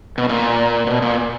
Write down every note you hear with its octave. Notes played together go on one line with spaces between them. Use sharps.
B2
A#2
B2
A#2